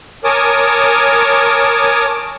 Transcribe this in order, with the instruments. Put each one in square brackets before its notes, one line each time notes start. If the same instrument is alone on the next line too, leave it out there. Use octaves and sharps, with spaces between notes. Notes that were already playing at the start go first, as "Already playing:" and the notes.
[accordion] A#4 C#5 G#5 A5 D6 D#6